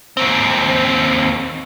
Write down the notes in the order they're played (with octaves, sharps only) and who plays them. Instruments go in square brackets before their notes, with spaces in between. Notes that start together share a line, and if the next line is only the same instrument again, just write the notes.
[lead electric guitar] D#2 C4